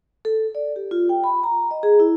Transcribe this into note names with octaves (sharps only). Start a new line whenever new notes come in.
A4
D5
G4
F4
G5
B5
A#5
D#5
G#4
E4